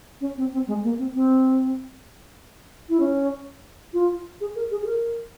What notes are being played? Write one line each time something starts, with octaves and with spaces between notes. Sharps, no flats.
C#4
C4
C4
G#3
A#3
C4
C4
E4
C#4
F4
G#4
A#4
G#4
G#4
A#4